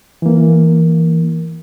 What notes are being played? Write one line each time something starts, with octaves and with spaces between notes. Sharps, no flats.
E3 A#3